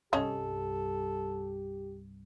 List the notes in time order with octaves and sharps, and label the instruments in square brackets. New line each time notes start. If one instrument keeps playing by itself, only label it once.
[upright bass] C2 G2 [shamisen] C#4 C#5 D#5 [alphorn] G4 [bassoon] A4